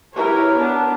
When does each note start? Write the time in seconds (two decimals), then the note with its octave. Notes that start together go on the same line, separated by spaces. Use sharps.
0.13 E4 G4 A#4 B4 C#5
0.56 B3 D4